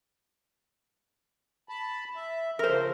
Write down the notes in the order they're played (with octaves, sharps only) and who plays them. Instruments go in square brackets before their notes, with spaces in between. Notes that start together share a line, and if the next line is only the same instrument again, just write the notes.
[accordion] A5 B5
E5
[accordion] C#3 F3 [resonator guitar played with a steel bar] A#4 C5